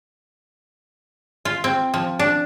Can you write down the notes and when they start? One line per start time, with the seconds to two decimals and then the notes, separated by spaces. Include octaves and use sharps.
1.45 F4
1.64 C4
1.94 F3
2.19 D4